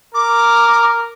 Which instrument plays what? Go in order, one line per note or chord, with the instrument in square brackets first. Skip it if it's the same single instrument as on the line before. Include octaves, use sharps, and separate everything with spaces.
[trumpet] A#4 [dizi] D6